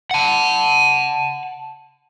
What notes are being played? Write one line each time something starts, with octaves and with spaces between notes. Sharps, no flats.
F#5 A5